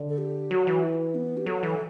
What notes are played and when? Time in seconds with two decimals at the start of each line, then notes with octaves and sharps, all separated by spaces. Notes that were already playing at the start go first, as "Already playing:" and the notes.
Already playing: D3
0.09 A4
0.18 G4
0.50 F#3 F#4
0.67 E3
0.83 E4
1.15 B3
1.37 G4
1.46 F#3 A4
1.63 E3